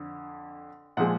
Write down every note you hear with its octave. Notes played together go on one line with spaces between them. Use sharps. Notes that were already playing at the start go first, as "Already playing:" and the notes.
Already playing: F2 D3
A#2 F3 G#3 F#5